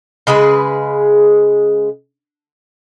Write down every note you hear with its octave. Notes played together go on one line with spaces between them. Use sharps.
C#3 G#3 G#4 B4